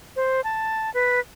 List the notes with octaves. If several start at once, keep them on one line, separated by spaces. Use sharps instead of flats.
C5
A5
B4